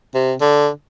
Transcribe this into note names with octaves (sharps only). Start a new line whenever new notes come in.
C3
D3